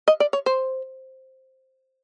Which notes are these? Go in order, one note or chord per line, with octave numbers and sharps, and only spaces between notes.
D#5
D5
C#5
C5